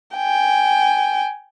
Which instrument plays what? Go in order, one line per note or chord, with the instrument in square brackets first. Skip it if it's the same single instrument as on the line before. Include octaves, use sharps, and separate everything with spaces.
[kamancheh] G5 G#5